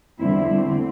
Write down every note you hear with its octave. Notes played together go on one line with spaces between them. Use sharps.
E2 D3 G3 C4 E4
D3 A3 C4